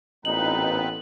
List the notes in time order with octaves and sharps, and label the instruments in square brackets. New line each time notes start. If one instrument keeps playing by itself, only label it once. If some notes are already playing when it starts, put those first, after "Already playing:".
[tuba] A1 [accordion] A#2 D#4 [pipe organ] B3 C4 B4 [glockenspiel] F#7